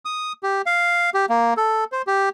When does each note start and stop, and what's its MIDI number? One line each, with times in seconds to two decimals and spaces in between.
0.05 0.33 87
0.43 0.62 67
0.66 1.10 77
1.14 1.26 67
1.29 1.54 58
1.57 1.84 69
1.92 2.02 72
2.07 2.29 67